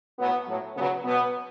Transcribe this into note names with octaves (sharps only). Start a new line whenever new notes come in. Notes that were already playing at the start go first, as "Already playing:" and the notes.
A2 F#3 B3
A2 F#3
C#3 F#3 B3
B2 F#3 B3